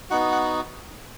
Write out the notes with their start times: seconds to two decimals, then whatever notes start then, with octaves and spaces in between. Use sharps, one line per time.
0.10 B3 D#4 F#4 F#5
0.32 F#5